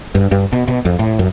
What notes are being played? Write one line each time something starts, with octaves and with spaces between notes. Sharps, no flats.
G2
G2
B2
B2
F2
A2
F#2